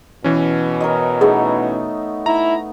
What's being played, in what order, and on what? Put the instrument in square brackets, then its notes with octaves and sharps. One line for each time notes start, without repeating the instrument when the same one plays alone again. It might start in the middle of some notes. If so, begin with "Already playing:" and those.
[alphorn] B2 [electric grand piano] E3 C#4
[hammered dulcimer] A#4 C#5 D#5
[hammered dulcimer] A3 B3 D#4 [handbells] G#4
[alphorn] E4 [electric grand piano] A#5